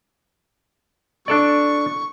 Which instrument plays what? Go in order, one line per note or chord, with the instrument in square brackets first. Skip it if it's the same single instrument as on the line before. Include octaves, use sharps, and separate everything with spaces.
[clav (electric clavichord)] D4 A4 D5 [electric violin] C#6